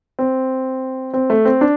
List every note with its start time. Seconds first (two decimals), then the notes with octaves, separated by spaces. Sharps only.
0.19 C4
1.14 C4
1.30 A3
1.45 C4
1.61 D4